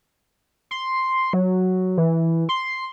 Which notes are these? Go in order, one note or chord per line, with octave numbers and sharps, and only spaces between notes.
C6
F#3
E3
C6